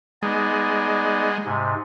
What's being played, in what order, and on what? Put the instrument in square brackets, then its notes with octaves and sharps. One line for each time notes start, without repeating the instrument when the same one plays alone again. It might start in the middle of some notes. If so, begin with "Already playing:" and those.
[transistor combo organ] G#3 [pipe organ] B3 D#4 D5
[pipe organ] G#2 C3